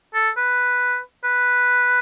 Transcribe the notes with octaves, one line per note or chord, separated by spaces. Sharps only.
A4
B4
B4